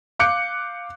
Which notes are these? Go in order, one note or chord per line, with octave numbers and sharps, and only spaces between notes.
F5 D6 F#6 G6 C#7